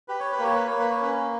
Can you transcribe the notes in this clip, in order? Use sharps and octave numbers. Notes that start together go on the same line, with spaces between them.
G4 B4
C#5
B4
A#3 C#5
B4
A#3 C#5
B4
C#5
C#4 B4